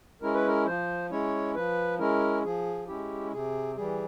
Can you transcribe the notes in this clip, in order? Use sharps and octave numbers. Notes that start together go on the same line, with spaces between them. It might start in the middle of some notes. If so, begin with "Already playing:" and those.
G#3 C#4 E4 A#4
B4
A#4
F3 C5
G#3 C#4 E4 C#5
F3 B4
G#3 C#4 E4 A#4
F3 G#4
G#3 C#4 E4 G4
C3 G#4
E3 G3 G#4